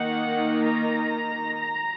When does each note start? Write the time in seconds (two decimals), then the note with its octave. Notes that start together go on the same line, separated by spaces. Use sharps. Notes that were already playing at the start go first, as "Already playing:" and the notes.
Already playing: D#3 A#3 D#4 F#5
0.66 A#5